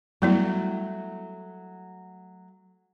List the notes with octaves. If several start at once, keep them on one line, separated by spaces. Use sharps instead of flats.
F#3 G3 A3 B3 E4